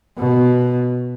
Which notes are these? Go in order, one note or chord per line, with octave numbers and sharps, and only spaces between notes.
B2